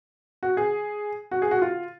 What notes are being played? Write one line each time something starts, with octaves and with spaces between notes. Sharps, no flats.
F#4
G#4
F#4
G#4
F#4
F4